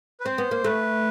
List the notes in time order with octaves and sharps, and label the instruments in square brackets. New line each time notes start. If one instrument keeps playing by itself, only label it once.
[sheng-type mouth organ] B4
[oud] C4 [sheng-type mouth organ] C5
[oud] B3
A#3
[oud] A3 [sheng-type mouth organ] B4